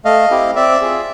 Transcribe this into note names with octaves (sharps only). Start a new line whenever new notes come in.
A3 D#5 F5
C4 E4 G4
C4 D5 E5
F4 G#4